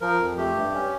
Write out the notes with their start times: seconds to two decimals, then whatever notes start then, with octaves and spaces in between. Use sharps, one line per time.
0.01 F3 A#4
0.19 F2
0.37 A3 G4
0.56 G2
0.74 C#4